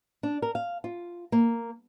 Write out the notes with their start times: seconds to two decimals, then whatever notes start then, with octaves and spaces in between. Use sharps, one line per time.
0.23 D4
0.42 A#4
0.55 F5
0.84 F4
1.32 A#3